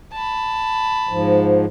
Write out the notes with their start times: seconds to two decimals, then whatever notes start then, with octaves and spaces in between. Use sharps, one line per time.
0.12 A5 B5
1.09 G#2 F3